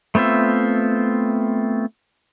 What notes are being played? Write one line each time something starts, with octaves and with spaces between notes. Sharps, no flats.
A3 B3 C4 F4 E5